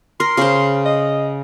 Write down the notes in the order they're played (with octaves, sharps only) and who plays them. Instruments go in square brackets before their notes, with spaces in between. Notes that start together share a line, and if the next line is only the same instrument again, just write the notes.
[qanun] A#4 [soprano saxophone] C6
[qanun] C#3 C5
[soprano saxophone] D#5